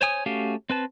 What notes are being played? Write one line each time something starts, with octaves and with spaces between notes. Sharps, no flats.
C5 C#5 G#5 D#6
A3 C#4 F#4 G4 F5
C4 B4 A5